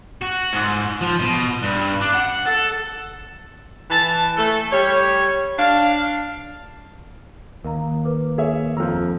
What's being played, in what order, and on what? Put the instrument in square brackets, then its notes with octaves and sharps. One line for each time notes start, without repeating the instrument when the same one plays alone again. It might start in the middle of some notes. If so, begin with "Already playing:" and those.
[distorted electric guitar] F#4
G#2
F3
B2
G2
D4
F#5
A4
[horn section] E3 A5
A3 A4
G3 G4 C#5
D4 F5
[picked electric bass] D#2 [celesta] A#4 F5 A#5
[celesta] A#4 B4 D6
[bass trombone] A#3 [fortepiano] G#4 C#5 E5
[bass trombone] F2 [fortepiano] F3 A#5 [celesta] E6